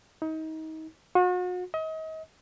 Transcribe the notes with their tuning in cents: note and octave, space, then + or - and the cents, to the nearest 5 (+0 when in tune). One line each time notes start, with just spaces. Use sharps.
D#4 +30
F#4 -40
D#5 +35